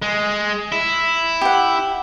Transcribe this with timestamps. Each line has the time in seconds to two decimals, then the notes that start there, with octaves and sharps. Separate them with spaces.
0.02 G#3
0.72 E4
1.41 G4 F#5